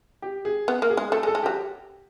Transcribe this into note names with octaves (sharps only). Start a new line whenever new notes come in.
G4
G#4
B3
A#3
G#4
G#3
A3 A4
G#3
A4
G#3
F#3 G4